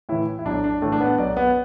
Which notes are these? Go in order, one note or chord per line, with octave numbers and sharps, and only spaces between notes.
A2 E3 E4
E4
B1 D4
D4
A2 E3 A3
D4
B3
B1 D5
B3